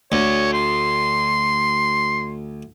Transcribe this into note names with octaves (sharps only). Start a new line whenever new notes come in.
D2 C#5
C6